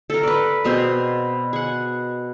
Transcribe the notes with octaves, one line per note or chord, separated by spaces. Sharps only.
A4 A#4
B4 D5
B2 B3 C4 G#4
G#4 F#5